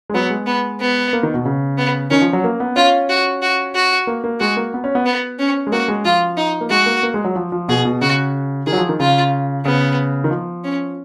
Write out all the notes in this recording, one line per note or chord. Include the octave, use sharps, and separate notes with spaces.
G#3
F#3 B3
G#3
B3
B3
A#3
D#3
B2
C#3
B3
D#3 C#4
F3
F#3
A#3
B3
C#4 F4
F#4
F#4
F#4
A#3
A#3
G#3 F#4
A#3
B3
C#4
B3
B3
C#4
G#3
A#3 F#4
G#3
F3 F4
D#4
A#3
G#3 F#4
A#3
A#3
G#3
F#3
F3
F3
B2 G#4
B2
C#3 F#4
D#3 G#4
F#3
F3
D#3
C#3 F4
C#3 B3
D#3
F3
C#4